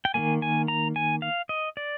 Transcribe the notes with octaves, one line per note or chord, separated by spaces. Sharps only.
G5
D#3 G3 A#3 G#5
G#5
A#5
G#5
F5
D#5
D5